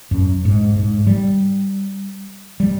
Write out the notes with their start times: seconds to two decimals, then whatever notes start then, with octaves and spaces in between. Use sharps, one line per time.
0.11 F#2
0.45 G#2
0.76 G#2
1.07 G3
2.60 G3